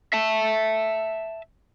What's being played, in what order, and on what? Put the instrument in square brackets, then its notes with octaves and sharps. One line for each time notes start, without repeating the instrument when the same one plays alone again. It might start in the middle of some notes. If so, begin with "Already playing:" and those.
[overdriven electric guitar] E5 A5